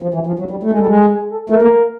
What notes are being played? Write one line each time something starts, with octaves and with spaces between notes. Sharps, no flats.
F3
E3
F3
F#3
G3
A3
G#3
G3 A4
G#3
G#4
A4
A3 A#4
A#3